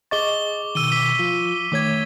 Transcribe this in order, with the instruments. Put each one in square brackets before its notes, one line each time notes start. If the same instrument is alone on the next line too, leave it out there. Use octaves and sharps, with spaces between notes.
[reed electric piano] G#4 D#5 A6 [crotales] C#6 D6 G7
[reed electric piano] B2 D#3 [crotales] E6 D#7 G7
[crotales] D6 E6 B6
[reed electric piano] F3 F4
[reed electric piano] D#3 A3 C#5 [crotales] D6 G#6